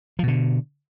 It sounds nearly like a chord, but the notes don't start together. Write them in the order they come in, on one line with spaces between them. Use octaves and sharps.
F3 B2 D3